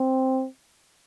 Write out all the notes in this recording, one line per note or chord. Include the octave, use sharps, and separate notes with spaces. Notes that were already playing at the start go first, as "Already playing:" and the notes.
Already playing: C4